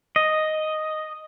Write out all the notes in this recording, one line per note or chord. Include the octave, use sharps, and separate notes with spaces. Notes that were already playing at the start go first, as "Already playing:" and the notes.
D#5